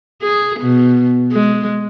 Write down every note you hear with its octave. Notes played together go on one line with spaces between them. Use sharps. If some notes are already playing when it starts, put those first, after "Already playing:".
G#4
B2
G#3